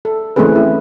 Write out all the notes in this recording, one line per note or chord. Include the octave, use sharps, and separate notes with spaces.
A4
E3 A3 C4 C#4 G#4 B4
E4